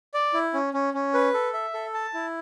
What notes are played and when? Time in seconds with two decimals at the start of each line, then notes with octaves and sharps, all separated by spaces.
0.14 D5
0.34 E4
0.54 C#4
0.74 C#4
0.94 C#4
1.14 B4
1.34 A4
1.54 E5
1.74 A4
1.94 A5
2.14 E4